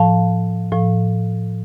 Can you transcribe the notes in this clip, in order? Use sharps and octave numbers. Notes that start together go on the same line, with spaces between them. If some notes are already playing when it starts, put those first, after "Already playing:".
Already playing: A2 F3 F5 A5
A2 F3